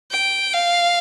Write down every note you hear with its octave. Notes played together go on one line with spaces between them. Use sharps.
G5
F5